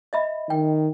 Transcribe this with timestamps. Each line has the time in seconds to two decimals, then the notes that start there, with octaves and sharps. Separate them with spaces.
0.13 D#5 E5 B5
0.50 D#3 G5